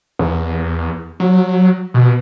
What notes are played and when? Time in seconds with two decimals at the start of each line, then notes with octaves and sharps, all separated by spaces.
0.19 E2
1.20 F#3
1.94 B2